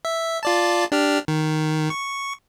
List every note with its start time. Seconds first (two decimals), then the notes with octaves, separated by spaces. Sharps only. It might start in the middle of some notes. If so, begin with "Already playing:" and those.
0.05 E5
0.43 F4 D5 A5
0.92 D4 G4 F6
1.28 D#3
1.90 C#6